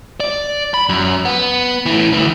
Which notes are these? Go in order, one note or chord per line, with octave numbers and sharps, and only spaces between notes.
D5
B5
F#2
B3
A2 E3
D2 E3